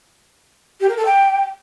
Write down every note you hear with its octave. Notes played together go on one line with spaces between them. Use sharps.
G4
A#4
A4
G5